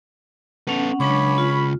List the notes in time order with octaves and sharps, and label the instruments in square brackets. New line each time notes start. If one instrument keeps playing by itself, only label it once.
[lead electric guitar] B3 A4 [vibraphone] C#4 F#5
[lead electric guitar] C#2 [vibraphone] F#3 D4 D6 [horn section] C#4 C#5 B5
[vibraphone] F4